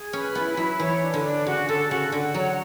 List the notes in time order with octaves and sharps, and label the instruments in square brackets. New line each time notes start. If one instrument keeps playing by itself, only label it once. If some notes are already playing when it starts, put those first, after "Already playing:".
Already playing: [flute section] G#4
[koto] C#4 [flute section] B4
[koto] B3 [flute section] E4
[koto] F#3 [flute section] E4
[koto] E3 [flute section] C#5
[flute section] D4
[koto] D3
[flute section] D4
[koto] C#3 [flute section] F#4
[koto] D3 [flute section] A4
[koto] C#3 [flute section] F#4
[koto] D3 [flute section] F#5
[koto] F#3 [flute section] C#5